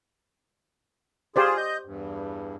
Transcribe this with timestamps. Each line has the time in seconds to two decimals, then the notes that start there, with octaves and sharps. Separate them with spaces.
1.36 F4 G4 G#4 C5 D5
1.57 D#5 G6
1.85 E2 G2